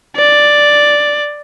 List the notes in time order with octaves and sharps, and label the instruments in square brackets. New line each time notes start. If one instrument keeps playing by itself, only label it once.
[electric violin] D5